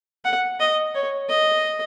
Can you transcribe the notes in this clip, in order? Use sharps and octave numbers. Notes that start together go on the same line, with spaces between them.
F#5
D#5
C#5
D#5